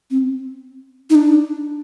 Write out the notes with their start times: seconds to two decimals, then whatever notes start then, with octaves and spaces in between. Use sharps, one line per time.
0.11 C4
1.10 D#4
1.15 D4